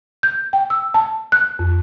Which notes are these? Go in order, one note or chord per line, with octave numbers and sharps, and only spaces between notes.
G6
G5
E6
A5
F#6
F2